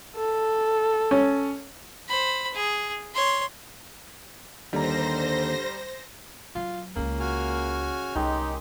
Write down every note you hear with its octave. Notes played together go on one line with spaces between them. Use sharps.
A4
C#4
C5 B5
G#4
C#5 C6
D#2 D3 G3 C5 A#5 A#6
F#3 F4
C#2 C#3 A#3 F4
F#4 G#5 F6
C2 D#3 G#3 D#4 G4